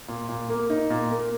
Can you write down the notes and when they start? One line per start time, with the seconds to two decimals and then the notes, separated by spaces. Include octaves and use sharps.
0.08 A#2
0.29 A#2
0.50 A#3
0.70 D#4
0.90 A#2
1.11 A#3